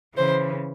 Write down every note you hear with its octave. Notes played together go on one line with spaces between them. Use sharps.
C#3 E3 C5